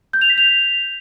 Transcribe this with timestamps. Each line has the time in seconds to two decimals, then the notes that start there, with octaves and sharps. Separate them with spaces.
0.13 G6
0.21 F7
0.30 B6
0.38 F7